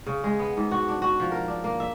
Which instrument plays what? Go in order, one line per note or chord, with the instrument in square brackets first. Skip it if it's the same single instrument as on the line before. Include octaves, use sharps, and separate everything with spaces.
[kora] C#3
G#3
B3
G#2
F#4
D4
F#4
F3
A#4
D4
A#3
E5